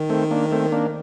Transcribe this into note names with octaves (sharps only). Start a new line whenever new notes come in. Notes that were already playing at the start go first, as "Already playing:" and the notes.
Already playing: D#3
A3 C4
A#3 D4
A3 C4
A#3 D4